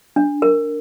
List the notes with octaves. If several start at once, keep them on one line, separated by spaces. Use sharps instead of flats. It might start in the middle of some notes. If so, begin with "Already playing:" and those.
D4
A#4